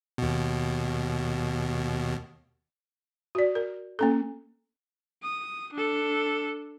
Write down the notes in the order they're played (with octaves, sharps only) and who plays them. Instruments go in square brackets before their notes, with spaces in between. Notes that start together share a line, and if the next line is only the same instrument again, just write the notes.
[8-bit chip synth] D#2 B2
[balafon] F#4 D5
A#4
A#3 C#4 A4
[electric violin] D#6
D4 A4